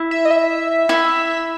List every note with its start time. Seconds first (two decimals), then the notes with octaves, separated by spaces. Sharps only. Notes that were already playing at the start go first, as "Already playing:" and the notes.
Already playing: E4
0.11 E5
0.25 D#5
0.31 E5
0.89 E4